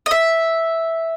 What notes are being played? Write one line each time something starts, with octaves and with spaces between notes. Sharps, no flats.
D#5
E5